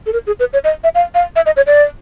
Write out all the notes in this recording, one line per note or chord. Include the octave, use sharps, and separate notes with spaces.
A4
A#4
G#4
B4
C#5
D#5
E5
F5
F5
E5
D#5
C#5
D5